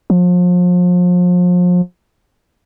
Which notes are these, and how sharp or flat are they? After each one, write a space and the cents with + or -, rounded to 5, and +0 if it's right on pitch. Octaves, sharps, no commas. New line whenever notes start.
F3 +35